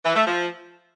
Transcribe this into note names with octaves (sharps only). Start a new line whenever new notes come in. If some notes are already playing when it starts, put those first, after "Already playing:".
E3
A3
F3